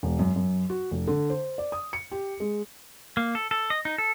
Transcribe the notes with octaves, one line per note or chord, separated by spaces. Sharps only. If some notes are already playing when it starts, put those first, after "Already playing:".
E1
F#2
F#2
F#4
F1
D3
C5
D5
D#6
C#7
G4
G#3
A#3
A4
A4
D#5
D#4
A4